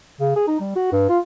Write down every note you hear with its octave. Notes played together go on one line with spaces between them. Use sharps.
C#3
G#4
D#4
G3
F#4
G2
F4